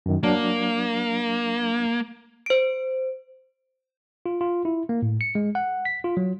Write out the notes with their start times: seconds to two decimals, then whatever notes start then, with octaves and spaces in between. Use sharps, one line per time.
0.06 F#2 D#3
0.23 F#3 A#3 D4
2.46 C5 D7
4.26 F4
4.41 F4
4.65 E4
4.89 A#3
5.02 A2
5.21 C#7
5.35 G#3
5.55 F#5
5.85 B6
6.04 F4
6.17 F#3